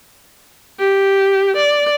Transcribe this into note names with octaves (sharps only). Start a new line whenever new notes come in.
G4
D5